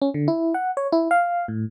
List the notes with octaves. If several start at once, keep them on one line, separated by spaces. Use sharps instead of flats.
C#4
D3
E4
F#5
C#5
E4
F5
A2